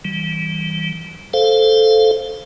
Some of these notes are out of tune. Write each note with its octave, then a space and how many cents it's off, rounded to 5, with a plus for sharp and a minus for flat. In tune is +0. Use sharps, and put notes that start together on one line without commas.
E3 -30 G3 -20
A4 -5 C5 +0 F5 +0